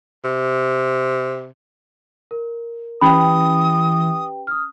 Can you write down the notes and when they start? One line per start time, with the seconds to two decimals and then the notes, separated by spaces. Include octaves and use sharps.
0.24 C3
2.31 A#4
3.01 E3 C#4 G4 B4 G5 B5 D#6
4.47 D#6 F6